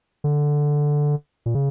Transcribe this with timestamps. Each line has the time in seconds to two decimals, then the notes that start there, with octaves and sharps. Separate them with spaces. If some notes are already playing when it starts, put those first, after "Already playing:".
0.24 D3
1.46 A#2
1.55 C#3